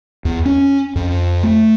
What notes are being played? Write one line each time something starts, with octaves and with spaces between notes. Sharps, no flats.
E2
C#4
F2
A3